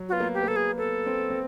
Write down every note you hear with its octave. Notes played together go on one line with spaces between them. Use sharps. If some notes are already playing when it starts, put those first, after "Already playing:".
Already playing: F#3
F#4
B3 F4
A#3
G4
A#3
B3 A4
G#4
B3 A4
C4
C4